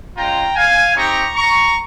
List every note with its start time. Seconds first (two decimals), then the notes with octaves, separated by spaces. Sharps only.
0.17 G#3 C#4 F4 G5 A#5
0.56 F5 G#5
0.96 C4 D#4 G4 A#5 C#6
1.35 A#5 C#6